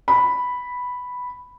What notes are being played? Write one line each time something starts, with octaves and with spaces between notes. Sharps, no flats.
B5